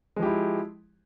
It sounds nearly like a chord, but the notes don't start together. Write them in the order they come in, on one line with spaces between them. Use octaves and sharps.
G#3 F3 G4 E4